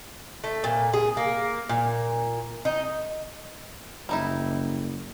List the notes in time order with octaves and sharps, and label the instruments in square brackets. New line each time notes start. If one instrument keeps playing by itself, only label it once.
[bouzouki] A3
A#2
G#4
A#3
A#2
D#4
[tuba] F#1 [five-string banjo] G3 D#4 E4